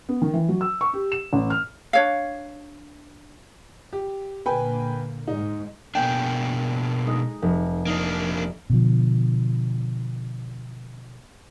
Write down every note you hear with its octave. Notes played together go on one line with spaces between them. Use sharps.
B3
D#3
E3
F#3
E6
C#6
G4
E7
A1
F6
D4 C#5 F5
G4
A#2 D3 A#3 B4 G5 G#5
G#2 D#4
B2 A#3 D4 G5 G#5
G#3 D#4
F1
A#3 D4 D#4
B2 D3 F3